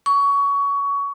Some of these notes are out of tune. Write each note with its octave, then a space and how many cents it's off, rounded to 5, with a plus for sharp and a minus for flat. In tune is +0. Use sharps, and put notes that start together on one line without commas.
C#6 +25